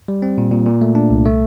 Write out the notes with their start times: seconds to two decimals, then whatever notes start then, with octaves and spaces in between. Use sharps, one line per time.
0.08 G3
0.22 C4
0.38 A#2
0.52 A#2
0.66 A#2
0.81 A3
0.95 D4
1.11 C2
1.25 A3